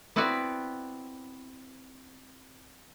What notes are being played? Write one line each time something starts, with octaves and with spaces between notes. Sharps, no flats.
B3 C4 E4 F#4 B4 D5